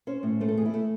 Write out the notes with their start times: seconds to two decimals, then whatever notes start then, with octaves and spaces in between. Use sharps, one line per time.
0.07 C#4 C5
0.23 A2
0.40 A3 C5
0.48 A4
0.57 E2 G#4
0.65 E4
0.74 A3